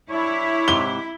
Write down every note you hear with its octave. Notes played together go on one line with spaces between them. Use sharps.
G3 D4 E4 C#5
G#2 C3 G7